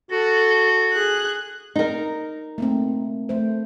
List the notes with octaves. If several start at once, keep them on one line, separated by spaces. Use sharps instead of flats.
F#4 A4
G#4 F#6
D#4 A#4
A3 A#3 C4
A3 C5